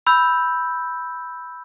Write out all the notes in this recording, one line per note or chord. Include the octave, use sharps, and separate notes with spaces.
B5 E6 G6